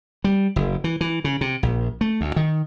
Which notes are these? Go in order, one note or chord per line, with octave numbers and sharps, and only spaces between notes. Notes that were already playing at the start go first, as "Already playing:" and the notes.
G3
F#1
E3
E3
C#3
C3
A#1
A3
D2
D#3